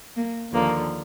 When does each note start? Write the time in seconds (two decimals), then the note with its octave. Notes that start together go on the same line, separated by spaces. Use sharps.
0.17 A#3
0.53 D#2 D3 F3 A#3